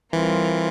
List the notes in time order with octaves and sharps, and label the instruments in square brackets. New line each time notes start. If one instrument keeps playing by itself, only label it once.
[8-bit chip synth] E3 [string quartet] G3 C4 F4 A#4